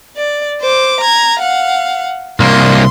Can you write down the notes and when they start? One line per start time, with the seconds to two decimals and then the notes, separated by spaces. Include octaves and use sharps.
0.16 D5
0.61 C5 D6
1.01 A#5 G#6
1.40 F5 F#5
2.40 C2 A#3 C6